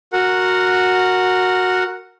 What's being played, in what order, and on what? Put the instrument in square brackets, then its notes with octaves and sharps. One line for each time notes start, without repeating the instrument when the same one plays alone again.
[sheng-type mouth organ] F#4 A#4 F#5